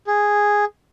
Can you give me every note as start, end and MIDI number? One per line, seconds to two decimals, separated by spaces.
0.07 0.65 68